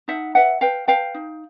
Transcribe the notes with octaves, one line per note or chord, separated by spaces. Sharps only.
D#4 E5 F#5
B4 E5 F#5
B4 F5 G5
B4 F5 G5
D#4